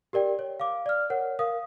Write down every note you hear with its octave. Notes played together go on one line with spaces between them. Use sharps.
G4 A#4 D5 G5
C#5
F5 D6
D5 F6
A#4 C#5 F#5
A#4 F5 D#6